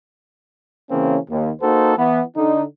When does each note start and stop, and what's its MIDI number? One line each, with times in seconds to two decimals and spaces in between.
0.91 1.18 49
0.91 1.18 52
0.91 1.18 58
0.91 1.18 60
0.91 1.18 61
1.30 1.50 39
1.62 1.94 58
1.62 1.94 63
1.62 1.94 66
1.62 1.94 69
1.62 1.94 72
1.98 2.21 52
1.98 2.21 59
2.37 2.63 50
2.37 2.63 63